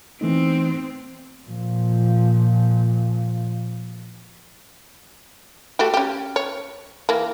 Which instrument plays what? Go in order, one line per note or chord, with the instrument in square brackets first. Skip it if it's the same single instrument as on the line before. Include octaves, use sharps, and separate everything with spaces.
[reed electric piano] E3 A3 D#4 [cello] B3 C4
[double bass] A#2 F3
[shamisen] A3 F#4 G4
C#4 G4
C#5
E3 A#3